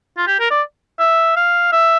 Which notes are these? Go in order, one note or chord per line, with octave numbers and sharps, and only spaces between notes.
F4
G4
A#4
D5
E5
F5
E5